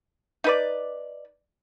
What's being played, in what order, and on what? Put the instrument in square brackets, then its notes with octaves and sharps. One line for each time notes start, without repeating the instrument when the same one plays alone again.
[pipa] D#4 B4 D5